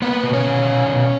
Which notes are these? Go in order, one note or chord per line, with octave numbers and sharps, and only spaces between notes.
A#3 B3 B4
B2
C#4 C#5
B2
B2
B2